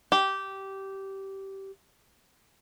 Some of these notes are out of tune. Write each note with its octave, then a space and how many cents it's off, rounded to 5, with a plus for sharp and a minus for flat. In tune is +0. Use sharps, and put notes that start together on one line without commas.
G4 -15